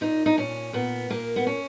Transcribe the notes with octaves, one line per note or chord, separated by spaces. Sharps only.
A#2 D#4
D#4
A#2 C#4
A#2 B3
A#2 A#3
B3
C#4